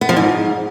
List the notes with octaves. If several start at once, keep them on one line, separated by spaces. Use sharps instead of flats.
B3
F3
G#2